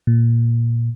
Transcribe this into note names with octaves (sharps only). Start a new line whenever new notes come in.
A#2